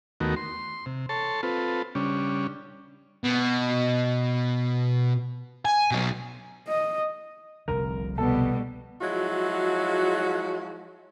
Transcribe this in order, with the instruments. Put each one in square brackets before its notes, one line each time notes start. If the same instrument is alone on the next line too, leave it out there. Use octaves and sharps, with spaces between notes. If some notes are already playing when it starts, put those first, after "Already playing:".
[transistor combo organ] D#2 D#3 A3 B3 F#4 A#4
C6
C3
A4 C#5 A5 C6
C4 F4 A4 B4
C#3 G3 C#4 D4
[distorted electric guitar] B2
G#5
B2 F#3
[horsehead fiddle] D#5
[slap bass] F1 C2 D3 [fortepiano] A#4
[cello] B2 G3 [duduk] B3 [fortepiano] A4
[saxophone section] F3 F#3 G#3 E4 F#4